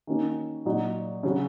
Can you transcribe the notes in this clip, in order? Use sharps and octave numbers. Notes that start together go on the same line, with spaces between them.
D#3 A#3 C#4 F#4
A#2 F#3 D#4 F#4
C#3 F#3 C#4 F#4